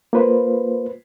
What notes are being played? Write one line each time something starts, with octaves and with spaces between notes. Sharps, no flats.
A#3 F4 B4 C5